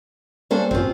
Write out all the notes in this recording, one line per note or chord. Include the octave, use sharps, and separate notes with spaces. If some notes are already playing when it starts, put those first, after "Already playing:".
G3 A#3 C#4 D4 A4 C5
A1 G2 C4 C#4 F4